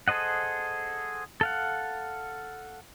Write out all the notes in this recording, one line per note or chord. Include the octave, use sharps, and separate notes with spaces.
G#4 A4 C5 D#5 F#5
A4 F5 F#5